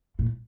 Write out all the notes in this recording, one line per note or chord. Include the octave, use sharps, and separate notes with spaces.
A2